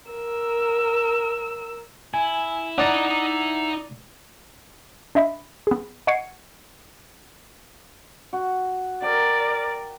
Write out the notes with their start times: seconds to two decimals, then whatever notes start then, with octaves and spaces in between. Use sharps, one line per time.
0.11 A#4 E6
2.14 E4 G#5
2.78 D4 D#4 D5 F#5 A#5
5.15 D4 D#5 E5 B5
5.67 B3 G#4
6.07 D#5 F#5 C#6 G#6 C7 C#7
8.33 F#4
9.02 A#4 D5 G5